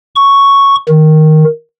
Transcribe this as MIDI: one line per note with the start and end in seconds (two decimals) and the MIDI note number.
0.16 0.75 85
0.88 1.44 51